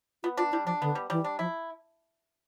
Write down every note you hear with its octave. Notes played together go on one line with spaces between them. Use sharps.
B3 F4
D4 F4
G3 E4
F3 D4
D3 B3
G3
E3 G3
D4
F3 E4